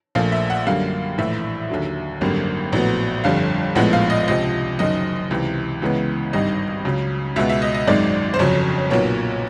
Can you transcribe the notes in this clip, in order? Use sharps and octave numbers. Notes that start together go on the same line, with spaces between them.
A#1 A#2 F3 A3 F5
E5
F#5
F#2 D3 G3 A#3 F5
A#1 A2 E3 E5
D#2 D3 F#3
G#1 F#2 D3 G3 A#3
A#1 A2 F#3 B3
G1 F2 D3 G3 F5
A#1 A2 F3 G#3 B3 F#5
F5
D#5
C#2 C3 F3 D#5
F#1 F#2 D#3 D#5
C#2 C3 E3
C#2 C#3 E3 G#3 B3
G#1 G2 D#3 G3 D#5
C#2 C#3 F#3
C#2 B2 G#3 B3 E5
E5
D#5
D#5
G#1 F#2 D#3 G#3 D5
C5
G1 F2 C#3 F#3 C#5
B1 A#2 F#3 B3 C#5